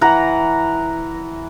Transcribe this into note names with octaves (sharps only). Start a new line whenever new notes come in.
E3 F#5 A#5